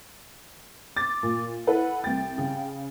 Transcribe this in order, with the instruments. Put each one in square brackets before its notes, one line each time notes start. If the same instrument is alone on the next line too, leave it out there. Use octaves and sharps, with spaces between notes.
[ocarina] D6 [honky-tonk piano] A6
[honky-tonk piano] A#2
[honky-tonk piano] E4 A4 B4 [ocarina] F#5
[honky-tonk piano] C2 A6 [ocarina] G5
[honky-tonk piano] C#3